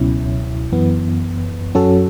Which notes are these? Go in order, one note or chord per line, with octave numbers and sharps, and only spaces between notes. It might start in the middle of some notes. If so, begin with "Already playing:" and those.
Already playing: C#2 B2 F#3 C#4 E4
F#2 E3 B3
F#2 F#3 C#4 F#4 A4